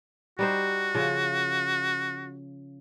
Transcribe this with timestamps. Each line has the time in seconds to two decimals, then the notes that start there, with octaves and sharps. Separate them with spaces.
0.39 G3 D#4 F#4 C5
0.95 C#3 F3